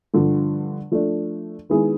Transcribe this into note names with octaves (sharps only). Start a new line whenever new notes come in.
G2 D3 F3
F3 A3 D4
D#3 G#3 B3 E4 G#4